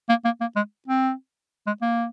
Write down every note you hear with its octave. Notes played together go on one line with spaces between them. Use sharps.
A#3
A#3
A#3
G#3
C4
G#3
A#3